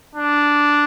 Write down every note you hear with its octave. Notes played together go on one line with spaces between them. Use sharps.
D4